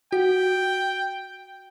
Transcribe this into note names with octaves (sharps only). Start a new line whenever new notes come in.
F#4 F#5 G5